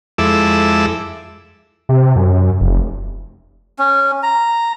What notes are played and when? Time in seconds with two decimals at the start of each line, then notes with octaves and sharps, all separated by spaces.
0.18 F2 G#3 E4 A4 D6 E6
1.89 C3
2.16 F#2
2.61 F1
3.79 C#4
4.23 A#5